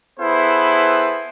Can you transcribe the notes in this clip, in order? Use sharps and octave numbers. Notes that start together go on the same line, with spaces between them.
B3 E4 G#4 A4 B4 C5